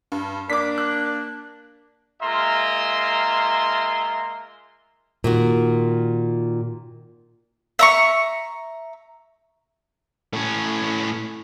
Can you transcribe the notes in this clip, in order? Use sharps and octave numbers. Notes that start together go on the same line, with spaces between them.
G2
A#3 D4 D6 B6
F#6
G#3 A#3 F4 E5 A#5 C6
A#2 D#3 F#4
E5 A#5 C#6
A2 C#4